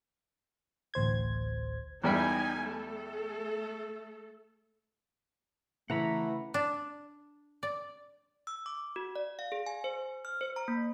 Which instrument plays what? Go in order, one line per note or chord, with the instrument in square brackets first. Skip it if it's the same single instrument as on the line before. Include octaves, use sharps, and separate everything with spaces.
[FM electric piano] A1 D2 C5 G#6
[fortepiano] E2 G3 G5 [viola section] D#4 G#5
[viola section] A3 A4
[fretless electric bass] C#3 [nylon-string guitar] E3 [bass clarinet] A3 [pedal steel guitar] F#5 A#5 B5
[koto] D4
D5
[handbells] E6
D6
F#4
D5
F5
G#4
G#5
C5
F6
C5
A#5
A#3